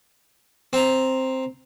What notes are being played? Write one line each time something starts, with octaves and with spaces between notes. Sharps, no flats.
C4 A#5